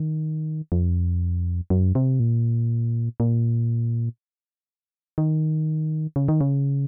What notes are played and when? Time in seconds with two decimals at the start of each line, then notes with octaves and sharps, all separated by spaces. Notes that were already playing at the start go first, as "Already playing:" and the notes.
Already playing: D#3
0.72 F2
1.70 F#2
1.95 C3
2.20 A#2
3.20 A#2
5.18 D#3
6.16 C#3
6.28 D#3
6.41 C#3